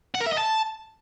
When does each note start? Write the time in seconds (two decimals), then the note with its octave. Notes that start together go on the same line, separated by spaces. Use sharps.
0.15 F#5
0.21 A#4
0.27 E5
0.32 D#5
0.38 A5